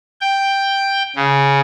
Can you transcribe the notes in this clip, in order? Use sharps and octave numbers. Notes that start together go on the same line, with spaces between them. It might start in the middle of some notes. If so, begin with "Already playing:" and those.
G5
C#3